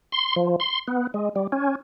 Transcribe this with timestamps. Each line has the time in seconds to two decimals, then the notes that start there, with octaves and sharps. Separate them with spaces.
0.12 C6
0.36 F3
0.60 C6
0.88 B3
1.14 G#3
1.36 G3
1.52 C#4